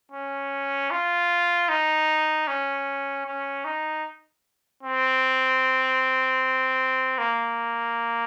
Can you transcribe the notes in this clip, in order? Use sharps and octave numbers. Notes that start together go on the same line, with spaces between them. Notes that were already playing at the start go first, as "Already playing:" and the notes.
C#4
F4
D#4
C#4
C#4
D#4
C4
A#3